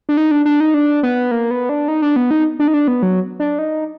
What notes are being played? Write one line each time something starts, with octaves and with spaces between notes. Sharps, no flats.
D4
D#4
D4
D4
D#4
D4
B3
A#3
B3
D4
D#4
D4
B3
D#4
D4
D#4
D4
B3
F#3
D4
D#4